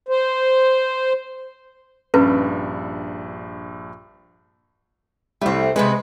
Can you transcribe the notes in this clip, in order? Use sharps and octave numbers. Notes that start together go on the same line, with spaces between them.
C5
A#1 G2 C#4 B4 B5
C2 G3 A3 C4
C3 G#3 B3 B4